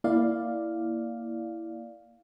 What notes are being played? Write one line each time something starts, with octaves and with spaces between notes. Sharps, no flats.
A#3 E4 D5 F5